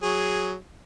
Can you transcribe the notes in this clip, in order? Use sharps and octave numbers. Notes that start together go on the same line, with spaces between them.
F#3 G#4